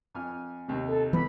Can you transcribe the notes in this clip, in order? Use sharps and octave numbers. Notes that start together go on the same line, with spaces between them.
F2 G#5 F6
D#2 C3
A4
E3 B3 B5